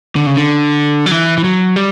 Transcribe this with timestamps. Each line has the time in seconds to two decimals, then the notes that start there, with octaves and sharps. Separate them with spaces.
0.16 D3
0.26 C#3
0.37 D3
1.06 F#3
1.12 E3
1.38 E3
1.44 F#3
1.76 G3